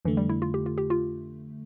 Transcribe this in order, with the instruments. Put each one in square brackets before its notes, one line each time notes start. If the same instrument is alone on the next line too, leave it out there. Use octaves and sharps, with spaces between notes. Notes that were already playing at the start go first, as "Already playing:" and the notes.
[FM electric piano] F2 D3 A3 [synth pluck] E3
[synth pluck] G3
E4
F4
G4
F4
G4
F4